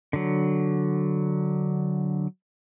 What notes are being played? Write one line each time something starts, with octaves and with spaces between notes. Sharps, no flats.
D3 F#3